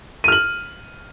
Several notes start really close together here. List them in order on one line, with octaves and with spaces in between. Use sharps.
D#7 F6 F#7